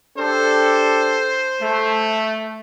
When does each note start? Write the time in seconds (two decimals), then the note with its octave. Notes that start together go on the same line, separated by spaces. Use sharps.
0.18 D4 G4 A4 C5
1.62 A3